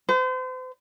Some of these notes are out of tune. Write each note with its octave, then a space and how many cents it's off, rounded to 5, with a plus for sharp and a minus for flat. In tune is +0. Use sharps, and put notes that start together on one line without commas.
C5 -40